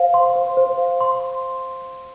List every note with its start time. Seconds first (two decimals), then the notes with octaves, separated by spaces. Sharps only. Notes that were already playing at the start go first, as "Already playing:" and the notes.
Already playing: C5 F5
0.14 C6
0.36 C5
0.57 C5
0.78 F5
1.01 C6